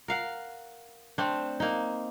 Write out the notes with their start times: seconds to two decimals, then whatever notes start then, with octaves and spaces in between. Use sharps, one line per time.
0.08 A#4 F5 F#5
1.18 A3 C4 D4
1.60 A#3 D#4